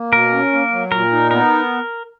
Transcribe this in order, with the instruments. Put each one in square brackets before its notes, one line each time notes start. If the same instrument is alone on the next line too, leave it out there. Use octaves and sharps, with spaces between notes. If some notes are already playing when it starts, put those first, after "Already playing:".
Already playing: [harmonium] A#3
[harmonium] B2 [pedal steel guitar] A#4
[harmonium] C#4
A#3
F#3
[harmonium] A#2 [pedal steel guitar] A#4
[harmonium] D#4
[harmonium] B3 [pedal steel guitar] A#4